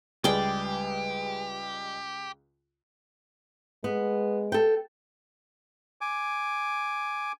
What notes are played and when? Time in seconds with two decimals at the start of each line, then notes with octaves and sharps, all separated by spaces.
0.24 C#2 G3 G#3 G4 G#4 B4 D5 G5
3.84 G#3 B3
4.52 A4 G5
6.01 G#5 D6